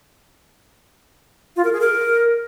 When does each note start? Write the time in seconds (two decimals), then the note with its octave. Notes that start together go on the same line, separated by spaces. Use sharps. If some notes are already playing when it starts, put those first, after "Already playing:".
1.56 F4
1.64 A#4
1.72 G#4
1.81 A#4